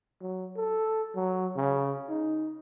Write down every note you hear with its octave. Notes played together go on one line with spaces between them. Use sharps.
F#3
A4
F#3
C#3
D#4